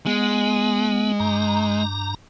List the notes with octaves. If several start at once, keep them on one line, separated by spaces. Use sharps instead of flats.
G#3 B3
G2 A#5